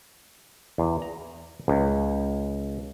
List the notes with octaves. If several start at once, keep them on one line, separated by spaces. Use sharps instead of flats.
E2
A#5
C#2